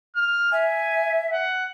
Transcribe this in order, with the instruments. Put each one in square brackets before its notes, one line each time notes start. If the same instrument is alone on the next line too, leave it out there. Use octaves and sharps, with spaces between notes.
[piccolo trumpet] F6
[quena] E5 [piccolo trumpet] G#5
[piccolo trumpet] F#5